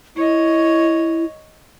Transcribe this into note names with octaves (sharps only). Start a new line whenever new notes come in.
E4 C#5 D#5